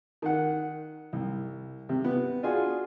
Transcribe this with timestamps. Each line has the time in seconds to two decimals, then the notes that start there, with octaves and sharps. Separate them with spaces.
0.22 D#3 F#5
1.13 C2
1.89 C3
2.04 B3
2.43 D4 F4 F#4 G#4 G#5